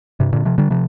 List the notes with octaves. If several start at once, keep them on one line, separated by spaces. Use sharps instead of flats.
G2 C3
A#2 D3
C3 F3
D3 G3
C3 F3